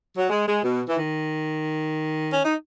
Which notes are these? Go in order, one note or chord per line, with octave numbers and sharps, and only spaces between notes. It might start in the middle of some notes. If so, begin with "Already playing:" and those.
F#3
G#3
G#3
B2
E3
D#3
C#4
D#4